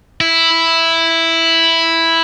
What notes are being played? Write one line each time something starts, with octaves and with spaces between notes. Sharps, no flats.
E4